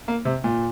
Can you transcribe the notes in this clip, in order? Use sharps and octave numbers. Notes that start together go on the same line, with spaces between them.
A#3
C3
A#2